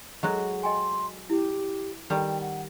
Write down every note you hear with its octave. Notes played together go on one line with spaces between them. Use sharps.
F#3 G#3 F#4 A4 C5 D#5
D#5 G5 G#5 C6
E4 G4
D#3 G3 G5 A5
F#5